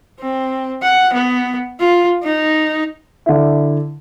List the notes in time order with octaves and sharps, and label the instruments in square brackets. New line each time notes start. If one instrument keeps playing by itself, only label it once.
[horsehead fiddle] C4
F#5
B3
F4
D#4
[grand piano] D3 E4